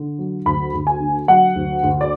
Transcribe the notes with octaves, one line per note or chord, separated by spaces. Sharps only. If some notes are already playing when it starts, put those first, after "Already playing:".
Already playing: D3
F#3
D2 B5
D2
G#5
D3
F#3 F#5
D2
D2
D5